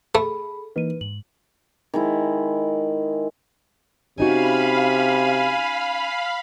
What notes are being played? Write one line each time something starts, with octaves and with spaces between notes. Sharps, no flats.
A3 G#4 A4 B5
E3 A#3 D#4 B4 D#7
G#2 F#7
D#3 G#3 E4
C3 C#4 D#4 F#4 F5 G#5 B5